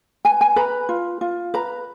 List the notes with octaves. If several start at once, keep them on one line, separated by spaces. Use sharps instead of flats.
B4 G#5
G#5
B4 A#5
F4
F4
B4 A#5